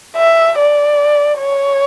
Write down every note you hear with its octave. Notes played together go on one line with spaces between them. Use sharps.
E5
D5
C#5